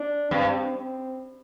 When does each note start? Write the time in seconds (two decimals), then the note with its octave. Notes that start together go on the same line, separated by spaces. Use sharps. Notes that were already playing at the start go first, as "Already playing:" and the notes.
Already playing: D4
0.31 G2 C4
0.76 C4